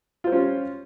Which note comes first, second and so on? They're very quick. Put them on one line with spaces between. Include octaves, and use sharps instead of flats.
F4 C5 G3 C#4